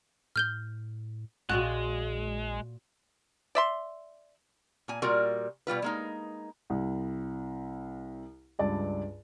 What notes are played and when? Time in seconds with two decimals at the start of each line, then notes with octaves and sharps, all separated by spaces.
0.36 A2 F6 G6 G7
1.50 A#1 A#2 G#3 F4 F#4 F#6
3.55 D5 E5 C6
4.88 A#2 G#5
5.02 A#2 G3 F4 F#4 A#4
5.67 B2 G3 F4 B4
5.82 G#3 A#3 D#4
6.70 C2
8.59 C#2 G2 D5 A5